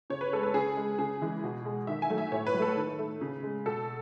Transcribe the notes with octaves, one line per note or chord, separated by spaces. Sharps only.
C#3 C#5
B4
G#3 A4
B4
C#3 G#4
G#3
C#3 G#4
E3 G#3
B2
G#3
D#3 E5
G#5
F#3 A3
E5
A2 C#5
B4
F#3
A3 A4
D#3
A3
C#3
G#3
B2 A4